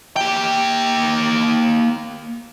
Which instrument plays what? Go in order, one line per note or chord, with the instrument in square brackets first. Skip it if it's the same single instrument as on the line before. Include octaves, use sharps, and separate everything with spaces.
[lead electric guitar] A#3 G5